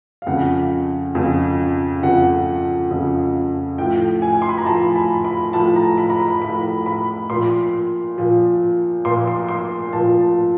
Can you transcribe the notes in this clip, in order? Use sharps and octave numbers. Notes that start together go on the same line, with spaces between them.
F5
F2 C#3 F3 F#5
F2 C#3 F3
F2 C#3 F3 F#5
F2 C#3 F3
A2 F3 G5
G#5
C6
B5
A#5
A2 F3 A5
B5
B5
A2 F3 A5
A#5
B5
A#5
B5
A2 F3 B5
B5
A#2 F3 C6
A#2 F3
A#2 F3 C6
C6
C6
A#2 F3 A5